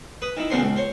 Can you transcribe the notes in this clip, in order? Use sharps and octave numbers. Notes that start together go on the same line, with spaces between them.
B4 D#6
D#3 E4
A#2 C#3 B3 D4 C5 C6
C#2
C5 C#5